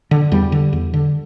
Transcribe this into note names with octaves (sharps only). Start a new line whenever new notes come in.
D3
E2 G3
D3
E2
D3